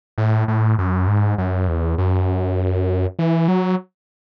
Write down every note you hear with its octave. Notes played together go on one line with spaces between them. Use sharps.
A2
A2
F#2
G#2
F#2
E2
F#2
E3
F#3